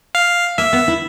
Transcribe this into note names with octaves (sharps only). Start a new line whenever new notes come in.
F5
A#3 E5
B3
E4